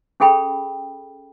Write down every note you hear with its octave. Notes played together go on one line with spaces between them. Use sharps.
C#4 G#4 A4 G5 B5